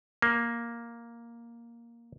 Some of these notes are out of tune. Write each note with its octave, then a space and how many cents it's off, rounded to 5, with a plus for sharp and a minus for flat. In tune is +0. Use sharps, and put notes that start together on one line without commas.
A#3 +5